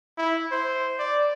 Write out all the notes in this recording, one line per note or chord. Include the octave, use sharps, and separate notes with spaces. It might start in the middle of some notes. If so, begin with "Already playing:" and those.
E4
C5
D5